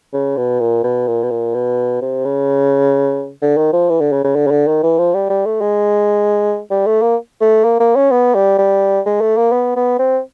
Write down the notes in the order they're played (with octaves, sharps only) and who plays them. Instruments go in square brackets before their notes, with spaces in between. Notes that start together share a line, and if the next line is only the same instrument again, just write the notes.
[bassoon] C#3
B2
A#2
B2
A#2
B2
A#2
B2
C3
C#3
D3
D#3
F3
E3
D3
C#3
C#3
D3
C#3
D3
D#3
E3
F3
G3
G3
A3
G#3
G3
A3
A#3
A3
A#3
A#3
C#4
B3
G3
G3
G#3
A3
A#3
B3
B3
C4